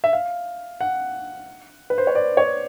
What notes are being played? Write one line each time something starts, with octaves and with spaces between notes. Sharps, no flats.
E5
F5
F#5
B4
C5
C#5
D5
C#5